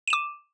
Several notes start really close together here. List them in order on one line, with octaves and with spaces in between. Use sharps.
D#7 E7 D6